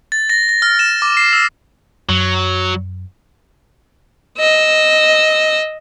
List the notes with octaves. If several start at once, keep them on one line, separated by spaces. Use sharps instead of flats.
A6
A#6
A#6
F6
E7
D6
C7
E6
F#2 F#3
D#5 E6